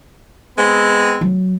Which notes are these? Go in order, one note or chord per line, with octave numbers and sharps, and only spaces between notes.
G#3 B3 C4
F#3